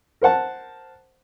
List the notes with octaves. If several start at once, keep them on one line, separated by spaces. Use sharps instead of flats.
A#4 C5 F#5 A5